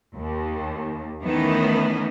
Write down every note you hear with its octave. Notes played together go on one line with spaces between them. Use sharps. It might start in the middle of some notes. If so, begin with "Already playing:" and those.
D#2
D#3 E3 A3 B3 C#4